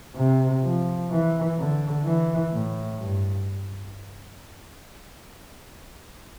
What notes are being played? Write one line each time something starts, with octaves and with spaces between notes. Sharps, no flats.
C3
F3
E3
D3
E3
A2
G2